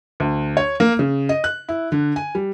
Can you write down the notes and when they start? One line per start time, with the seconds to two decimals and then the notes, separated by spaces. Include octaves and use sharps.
0.20 D2
0.57 C#5
0.80 A#3
0.99 C#3
1.29 D#5
1.44 F#6
1.69 E4
1.92 D3
2.16 G#5
2.35 G3